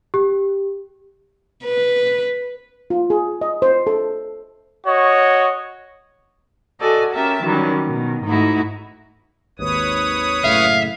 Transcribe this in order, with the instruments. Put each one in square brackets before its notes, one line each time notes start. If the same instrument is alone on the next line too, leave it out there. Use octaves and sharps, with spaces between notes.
[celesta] G4
[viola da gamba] B4
[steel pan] F4
G#4
D#5
C5
A4
[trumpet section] F#4 C#5 D#5
[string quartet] F#4 A4 D5 D#5 G#5
C#4 G4 A#4 E5 G5 A5
D#3 E3 F#3 G3 C#4
B2 D#3
G#2 A3 D#4 E4 F#4
[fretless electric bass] G#1 D#2 G#2 [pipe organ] B4 C#5 D#6
[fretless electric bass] F#1 A2 C#3 [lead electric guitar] E5 [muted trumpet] F5